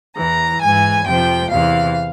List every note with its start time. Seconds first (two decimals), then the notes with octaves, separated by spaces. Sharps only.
0.16 E2 E3 A#5
0.61 G#2 E3 G#5
1.06 F2 C3 F3 G5
1.50 E2 C3 E3 F5